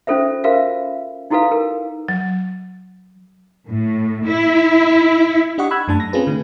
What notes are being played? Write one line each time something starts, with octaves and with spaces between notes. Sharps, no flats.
C#4 F4 A4 C5 E5
F4 F#4 A#4 C5 E5 F5
D#4 E4 F#4 A4 B4 F5
A#4
F#3
A2
E4
D4 G4 D#5 F#5 C#6
B5 E6 F#6 G#6
F#2 A3 D4 A5
A#6
C4 C#4 F4 G#4 B4
D3 A3